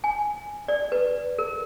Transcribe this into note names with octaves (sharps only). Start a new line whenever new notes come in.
G#5
D5
B4
A#4